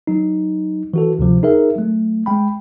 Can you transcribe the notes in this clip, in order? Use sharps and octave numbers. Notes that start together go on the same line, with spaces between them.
F#3 D#4
E3 F#4 A4
D2 C3 F3
D#4 G#4 A#4 E5
F#3 A3
G#3 G5 B5